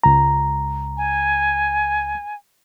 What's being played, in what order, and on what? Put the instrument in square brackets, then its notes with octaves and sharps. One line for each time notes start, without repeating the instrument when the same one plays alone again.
[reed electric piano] C#2 A#5
[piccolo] G#5